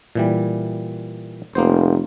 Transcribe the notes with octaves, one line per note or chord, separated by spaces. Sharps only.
A#2 E3 G3
F1 A#3 B3 C5